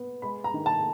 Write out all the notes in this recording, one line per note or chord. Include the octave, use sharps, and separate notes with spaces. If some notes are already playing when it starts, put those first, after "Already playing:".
Already playing: B3
G#3 B5
A#5
D#3
A5